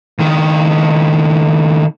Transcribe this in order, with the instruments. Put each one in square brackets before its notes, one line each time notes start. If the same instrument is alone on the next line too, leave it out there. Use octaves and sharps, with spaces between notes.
[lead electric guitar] C#2 D#3